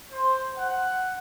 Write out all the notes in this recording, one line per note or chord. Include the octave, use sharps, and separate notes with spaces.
C5
F#5